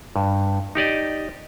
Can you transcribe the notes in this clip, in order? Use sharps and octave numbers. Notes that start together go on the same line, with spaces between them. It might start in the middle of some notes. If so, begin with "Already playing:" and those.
G2
D#4 G4 D5 D#5